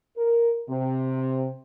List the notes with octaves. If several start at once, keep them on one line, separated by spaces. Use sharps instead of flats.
A#4
C3